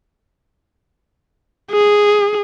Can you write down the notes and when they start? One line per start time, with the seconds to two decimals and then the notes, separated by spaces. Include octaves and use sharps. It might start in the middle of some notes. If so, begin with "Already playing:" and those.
1.71 G#4